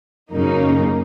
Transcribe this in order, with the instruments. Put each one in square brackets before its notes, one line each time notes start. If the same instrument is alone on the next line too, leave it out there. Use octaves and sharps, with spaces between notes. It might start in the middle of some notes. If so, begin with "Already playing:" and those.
[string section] F#2 C#3 F#3 A#3 D#4